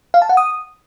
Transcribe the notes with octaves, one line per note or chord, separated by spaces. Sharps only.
F5
A5
F#5
D#6